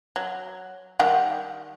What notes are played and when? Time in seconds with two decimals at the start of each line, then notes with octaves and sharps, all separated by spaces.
0.16 F#3
0.99 D#3 G3 F#5